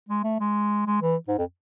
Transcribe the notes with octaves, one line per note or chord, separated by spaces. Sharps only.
G#3
A3
G#3
G#3
E3
G#2
F2